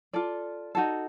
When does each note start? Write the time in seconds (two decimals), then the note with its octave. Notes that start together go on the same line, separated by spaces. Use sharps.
0.13 F4 A4 D5
0.75 D#4 F#4 A4